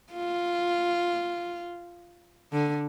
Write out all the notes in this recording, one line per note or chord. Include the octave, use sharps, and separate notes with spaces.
F4
D3